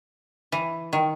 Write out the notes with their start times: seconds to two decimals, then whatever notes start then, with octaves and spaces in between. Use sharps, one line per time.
0.52 E3
0.93 D#3